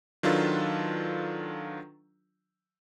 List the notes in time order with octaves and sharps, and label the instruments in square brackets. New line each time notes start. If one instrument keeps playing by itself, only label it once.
[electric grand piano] D#3 F#3 D4 F4 A4 B4